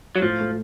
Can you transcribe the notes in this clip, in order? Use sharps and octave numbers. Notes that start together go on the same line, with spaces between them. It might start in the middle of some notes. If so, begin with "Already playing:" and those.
F#3
A2 F3
A3